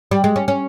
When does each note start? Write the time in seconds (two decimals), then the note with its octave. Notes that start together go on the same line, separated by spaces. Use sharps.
0.11 G3
0.24 G#3
0.36 C#4
0.48 C#4